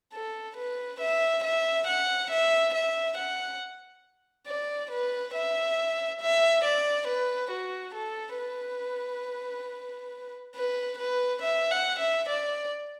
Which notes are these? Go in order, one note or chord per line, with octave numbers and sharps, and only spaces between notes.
A4
B4
E5
E5
F#5
E5
E5
F#5
D5
B4
E5
E5
D5
B4
F#4
A4
B4
B4
B4
E5
F#5
E5
D5